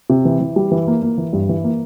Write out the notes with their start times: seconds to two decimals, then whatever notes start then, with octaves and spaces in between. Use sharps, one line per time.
0.09 C3
0.25 E3
0.41 E3
0.56 G3
0.71 E3
0.87 A#3
1.02 A#3
1.18 E3
1.33 G2
1.49 E3
1.64 A#3